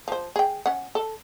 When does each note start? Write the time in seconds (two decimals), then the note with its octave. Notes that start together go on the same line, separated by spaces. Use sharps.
0.08 F3 C5
0.36 G#4 G5
0.66 C#4 F#5
0.95 A4